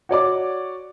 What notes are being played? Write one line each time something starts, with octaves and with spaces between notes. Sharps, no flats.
F#4 C#5 D5 D6